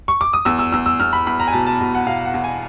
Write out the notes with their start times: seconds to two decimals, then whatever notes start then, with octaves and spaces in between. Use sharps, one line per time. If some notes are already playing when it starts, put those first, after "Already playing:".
0.08 C#6
0.21 D6
0.33 D#6
0.45 E2 E6
0.59 E6
0.72 E2 E6
0.86 E6
1.00 E2 F6
1.13 B5
1.27 E2 B5
1.40 A#5
1.47 G#5
1.53 B2 A5
1.66 A5
1.81 B2
1.95 F#5
2.07 B2 F5
2.26 F#5
2.34 E2
2.44 G#5